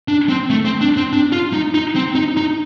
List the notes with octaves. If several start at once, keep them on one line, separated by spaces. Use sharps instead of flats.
D4
C4
A3
C4
D4
C4
D4
F4
D#4
D#4
C4
D#4
D#4